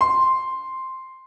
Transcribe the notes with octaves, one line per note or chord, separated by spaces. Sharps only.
C6